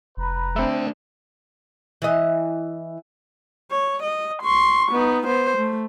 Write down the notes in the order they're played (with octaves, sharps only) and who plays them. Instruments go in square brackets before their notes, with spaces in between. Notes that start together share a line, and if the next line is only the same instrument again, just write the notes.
[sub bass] F1 [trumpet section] B4 A#5 B5
[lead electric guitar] A3 D4 [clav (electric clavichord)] C4 E5
[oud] E3 D#5
[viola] C#5
D#5
C6 C#6
B3 D#4
B3 C5
A3